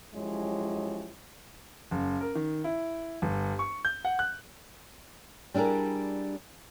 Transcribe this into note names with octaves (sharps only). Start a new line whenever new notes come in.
F#2 F3 G#3 E4 G4 C#5
F#1
A#4
D#3
E4
G1
C#6
G6
F#5
F#6
G3 D4 E4 G#4 A#4